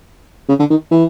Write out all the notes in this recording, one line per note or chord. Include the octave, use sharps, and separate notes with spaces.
C#3
D3
D#3
E3